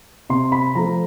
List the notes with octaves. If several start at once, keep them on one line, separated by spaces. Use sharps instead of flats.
C3 C6
B5
F3 A3 A#5